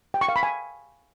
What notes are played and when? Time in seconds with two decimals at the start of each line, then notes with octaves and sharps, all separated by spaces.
0.14 G5
0.21 C#6
0.29 F5
0.36 B5
0.43 G#5